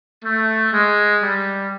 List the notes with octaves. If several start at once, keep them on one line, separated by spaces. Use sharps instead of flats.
A3
G#3
G3